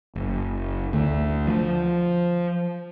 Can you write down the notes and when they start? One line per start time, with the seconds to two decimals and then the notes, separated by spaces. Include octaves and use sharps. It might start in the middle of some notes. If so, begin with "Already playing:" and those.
0.15 F#1
0.93 D2
1.47 F3